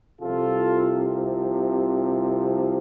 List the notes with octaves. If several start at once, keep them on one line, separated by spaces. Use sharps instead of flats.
C2 C3 F3 F4 A4